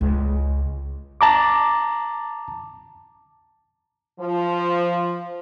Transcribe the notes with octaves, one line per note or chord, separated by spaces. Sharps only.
C#2
A5 A#5 D6
F3